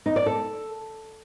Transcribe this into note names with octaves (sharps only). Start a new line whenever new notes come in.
D#4
D5
A4